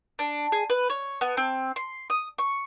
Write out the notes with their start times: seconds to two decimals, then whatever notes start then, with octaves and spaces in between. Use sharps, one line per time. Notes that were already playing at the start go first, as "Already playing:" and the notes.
0.19 D4
0.52 G#4
0.70 B4
0.90 C#5
1.21 B3
1.37 C4
1.76 C6
2.10 D#6
2.38 C#6